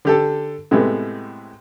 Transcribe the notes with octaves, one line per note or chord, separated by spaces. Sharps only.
D3 G4 A4
A2 C3 G#3 A3 B3